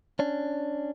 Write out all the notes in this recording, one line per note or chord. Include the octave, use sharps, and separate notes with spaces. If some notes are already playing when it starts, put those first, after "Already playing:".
C#4 D4